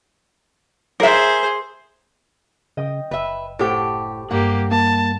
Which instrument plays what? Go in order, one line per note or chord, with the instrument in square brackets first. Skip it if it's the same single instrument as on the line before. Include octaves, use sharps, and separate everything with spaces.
[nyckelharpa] G#4 C5 [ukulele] A#4 E5
[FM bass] C#3 [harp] D#5 G5 D#6
[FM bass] F#1 [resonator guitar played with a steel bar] B4 E5
[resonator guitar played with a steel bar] A2 G4 [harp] A4 C5 F#5
[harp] G2 [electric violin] A#3 G4 [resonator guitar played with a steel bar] F#5
[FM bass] A#3 [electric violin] A5